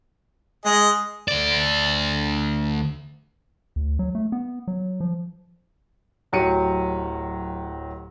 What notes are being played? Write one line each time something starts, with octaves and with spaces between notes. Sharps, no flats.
G#3 G#4 D#5
D2 D5
D2
F#3
A3
B3
F#3
F3
D1 F#3 G4 C#7 D#7